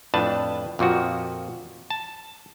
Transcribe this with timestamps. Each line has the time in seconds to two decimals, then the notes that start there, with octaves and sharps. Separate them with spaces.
0.14 F2 A2 D4 B4 A5
0.79 F2 A#2 F3 F#4
1.90 A5